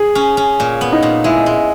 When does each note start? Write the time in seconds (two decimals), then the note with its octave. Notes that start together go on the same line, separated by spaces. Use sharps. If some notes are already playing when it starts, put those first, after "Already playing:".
Already playing: G#4
0.15 C#4
0.37 C#4
0.60 A#2
0.81 B3
0.92 D#4
1.03 A#2
1.24 G#3 E4
1.46 G#3